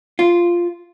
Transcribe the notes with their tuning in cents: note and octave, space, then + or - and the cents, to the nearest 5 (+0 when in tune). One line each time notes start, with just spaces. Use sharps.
F4 -5